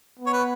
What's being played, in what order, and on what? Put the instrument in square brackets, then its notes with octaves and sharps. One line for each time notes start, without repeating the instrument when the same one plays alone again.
[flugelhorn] B3
[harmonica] C#5
B4